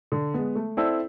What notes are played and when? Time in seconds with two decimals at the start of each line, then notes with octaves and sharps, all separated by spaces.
0.12 D3
0.34 G#3 B3
0.55 A3
0.77 C4 E4 A4 D5